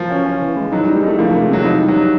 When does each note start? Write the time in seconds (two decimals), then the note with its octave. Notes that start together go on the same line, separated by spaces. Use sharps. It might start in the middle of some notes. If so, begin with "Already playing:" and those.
Already playing: F3 F#3 A#3
0.11 C#4
0.26 C#4
0.41 E3
0.57 G#3
0.71 F#3 D#4
0.83 G3
0.88 D#4
0.95 G#3
1.03 A3 D#4
1.18 F3 A#3
1.30 A3
1.34 C3
1.41 G#3
1.49 C3 F#3
1.64 F3 D#4
1.81 G3
1.88 F#3
1.95 D#4